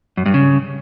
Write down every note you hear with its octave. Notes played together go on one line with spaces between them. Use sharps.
F#2
G2
C#3